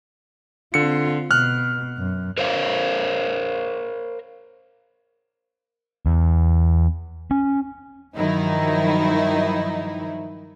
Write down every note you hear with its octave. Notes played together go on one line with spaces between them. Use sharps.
D3 C4 F4 C#7
B2 F6 F#6
F#2
A#4 C5 C#5 F5
E2
C#4
G2 D#3 F3 F#3 D#4 E4